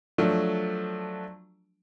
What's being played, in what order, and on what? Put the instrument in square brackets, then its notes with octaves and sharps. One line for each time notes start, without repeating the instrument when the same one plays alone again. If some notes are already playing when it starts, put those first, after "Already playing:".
[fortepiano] F3 F#3 A3 D4